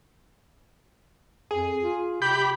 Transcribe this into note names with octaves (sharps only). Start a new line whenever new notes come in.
F2 G#4
F4
C3 G4 B5 G6